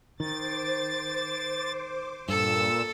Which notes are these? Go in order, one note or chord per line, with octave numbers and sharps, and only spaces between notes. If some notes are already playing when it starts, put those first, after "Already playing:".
D#3 C5 D6 A6
G2 A#2 A4 E6